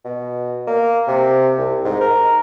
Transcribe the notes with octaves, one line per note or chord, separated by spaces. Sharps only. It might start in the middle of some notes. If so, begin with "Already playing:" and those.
B2
A#3
C3
C2
G#2
A#4